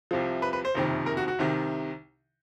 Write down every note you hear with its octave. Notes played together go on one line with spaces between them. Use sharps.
C2 C3 F3
B4
B4
C5
F#1 F2 C3 D#3
A#4
F#4
F#4
C2 C3 D#3